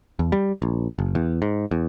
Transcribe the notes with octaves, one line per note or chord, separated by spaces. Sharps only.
E2
G3
A#1
F#1
E2
G#2
E2